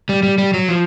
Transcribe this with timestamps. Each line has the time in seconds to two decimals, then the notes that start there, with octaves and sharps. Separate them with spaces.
0.09 G3
0.23 G3
0.38 G3
0.54 F#3
0.68 F3